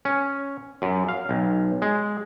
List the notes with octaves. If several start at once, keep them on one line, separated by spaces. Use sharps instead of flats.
C#4
F#2
F5
B1
G#3